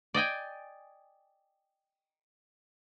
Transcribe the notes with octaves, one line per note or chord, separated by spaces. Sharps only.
D5 D#5 G5 G#5